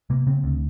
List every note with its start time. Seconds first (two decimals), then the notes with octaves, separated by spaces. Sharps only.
0.10 C3 A#3
0.27 C#3 C4
0.44 D2